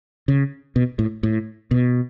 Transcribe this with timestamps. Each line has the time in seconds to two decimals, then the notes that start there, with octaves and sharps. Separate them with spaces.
0.28 C#3
0.76 B2
0.99 A2
1.23 A2
1.71 B2